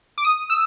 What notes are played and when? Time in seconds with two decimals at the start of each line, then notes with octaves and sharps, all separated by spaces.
0.18 D6
0.24 D#6
0.50 E6